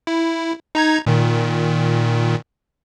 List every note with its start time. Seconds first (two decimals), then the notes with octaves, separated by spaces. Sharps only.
0.07 E4
0.75 D#4 A#5 G#6
1.06 A#2 D#3